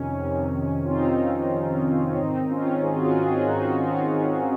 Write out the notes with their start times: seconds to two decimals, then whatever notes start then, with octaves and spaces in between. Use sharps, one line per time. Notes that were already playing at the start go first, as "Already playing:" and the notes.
Already playing: F2 C3 D#3 C#4
0.24 F2 C3 D#3
0.85 F4
0.88 F2 C3 D#3 C4 D#4
1.53 F2 C3 D#3
2.06 C#4
2.17 G#2 D#3 C4 D#4
2.50 C#4 F4
2.82 G#2 D#3 F4 G#4
2.96 F#4
3.04 F4 G#4
3.25 F4 G#4
3.47 G#2 D#3 D#4 F#4
3.79 C#4 F4
4.13 G#2 D#3